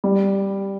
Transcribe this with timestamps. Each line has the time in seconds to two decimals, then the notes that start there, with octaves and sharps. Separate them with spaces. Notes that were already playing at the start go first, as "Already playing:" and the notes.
0.04 G3